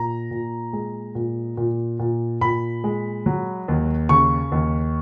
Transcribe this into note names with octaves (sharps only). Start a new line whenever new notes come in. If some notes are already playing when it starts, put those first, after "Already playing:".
Already playing: A#2 A#5
A#2
G#3
A#2
A#2
A#2
A#2 B5
G#3
F#3
D#2
C#3 C#6
D#2